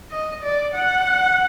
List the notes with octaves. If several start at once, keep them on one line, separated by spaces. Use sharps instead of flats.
D#5
D5
F#5